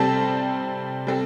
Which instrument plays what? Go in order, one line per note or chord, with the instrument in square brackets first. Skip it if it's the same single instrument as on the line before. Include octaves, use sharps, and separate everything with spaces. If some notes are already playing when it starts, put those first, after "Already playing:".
Already playing: [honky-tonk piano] C3 G3 C4 A4 C5 [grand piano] A5
[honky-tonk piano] G3 C4 A4